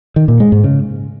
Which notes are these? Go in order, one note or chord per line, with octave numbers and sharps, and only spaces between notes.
D#3
A#2
G#3
G#2
C#3